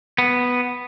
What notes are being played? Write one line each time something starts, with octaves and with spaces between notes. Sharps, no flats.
B3